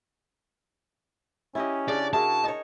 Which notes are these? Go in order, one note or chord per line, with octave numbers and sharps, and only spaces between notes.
C#4 E4 G4 D#5
C#3 D4 D5
E4 F#4 G#4 A#4 A5
D#4 C#5